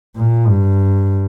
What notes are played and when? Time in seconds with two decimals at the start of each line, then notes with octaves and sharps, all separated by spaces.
0.16 A#2
0.49 G2